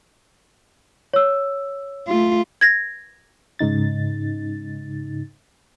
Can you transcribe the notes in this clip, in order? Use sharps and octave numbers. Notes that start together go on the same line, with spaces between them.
C#5 E6
A3 F4
G#6 A#6
G#2 C#3 D#4 A6